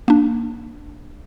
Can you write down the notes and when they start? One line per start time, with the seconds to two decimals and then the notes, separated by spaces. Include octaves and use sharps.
0.08 A#3 D4